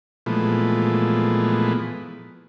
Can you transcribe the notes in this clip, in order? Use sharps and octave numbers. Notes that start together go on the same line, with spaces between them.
A#2 E3 F3 G#3 A3 B3